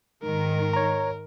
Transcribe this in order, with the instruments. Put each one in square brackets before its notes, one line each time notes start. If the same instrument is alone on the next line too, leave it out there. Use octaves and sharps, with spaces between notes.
[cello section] G#2 D#3 [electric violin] A#4
[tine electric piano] C#5 A#5